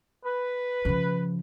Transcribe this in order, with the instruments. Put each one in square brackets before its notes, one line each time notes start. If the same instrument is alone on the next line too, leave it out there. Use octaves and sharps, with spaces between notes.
[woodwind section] B4
[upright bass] C#3 F3